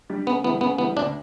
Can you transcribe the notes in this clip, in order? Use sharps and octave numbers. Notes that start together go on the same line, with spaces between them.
G3 D4
C#3 B3
E3 G3 B3
C#3 B3
E3 G3 B3
D2 D4